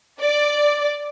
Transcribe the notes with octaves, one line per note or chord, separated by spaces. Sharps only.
D5